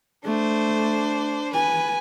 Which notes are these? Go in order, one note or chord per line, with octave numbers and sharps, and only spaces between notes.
A3 D4 C5
B4 G#5